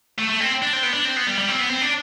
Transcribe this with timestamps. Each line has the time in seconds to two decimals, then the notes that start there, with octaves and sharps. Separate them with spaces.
0.19 A3
0.30 A3
0.41 C4
0.62 D4
0.73 C4
0.83 B3
0.94 D4
1.05 C4
1.16 B3
1.27 G3
1.38 G3
1.49 C4
1.59 B3
1.70 C4
1.82 D4